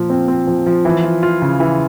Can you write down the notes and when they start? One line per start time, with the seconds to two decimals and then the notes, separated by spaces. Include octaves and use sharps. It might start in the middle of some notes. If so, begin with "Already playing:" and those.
Already playing: A#2 F3
0.10 C4
0.28 C4
0.47 F3
0.66 F3
0.85 E3
1.04 F4
1.23 F4
1.42 C#3
1.60 E3